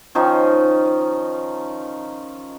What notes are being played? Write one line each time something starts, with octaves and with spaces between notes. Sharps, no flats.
D#3 F3 C#4 D#4